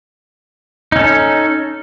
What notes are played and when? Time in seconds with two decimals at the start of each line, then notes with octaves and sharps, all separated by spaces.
0.92 D#4
0.96 C#4
0.99 A4